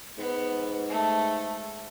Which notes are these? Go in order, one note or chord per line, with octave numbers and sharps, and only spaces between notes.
G#2 B3
A3